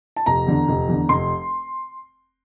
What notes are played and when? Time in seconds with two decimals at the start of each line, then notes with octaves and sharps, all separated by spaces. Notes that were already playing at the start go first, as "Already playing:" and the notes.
0.16 A5
0.26 F1 A#5
0.47 E2 D3
0.68 F1
0.88 E2 D3
1.09 F1 C6